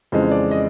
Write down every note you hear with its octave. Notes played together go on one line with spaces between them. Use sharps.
F2 C#3 E3 G#3 C5
D5
D#5